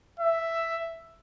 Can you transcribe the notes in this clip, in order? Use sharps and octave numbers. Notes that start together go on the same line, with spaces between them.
E5